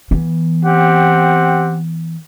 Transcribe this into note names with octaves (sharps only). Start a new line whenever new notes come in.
E3 B3
C4 G4 F#5